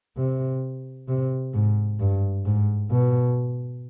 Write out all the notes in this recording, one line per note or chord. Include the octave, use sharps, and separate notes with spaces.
C3
C3
G#2
G2
G#2
B2